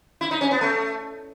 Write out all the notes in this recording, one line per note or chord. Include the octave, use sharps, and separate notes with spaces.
E4
D#4
C#4
B3
A3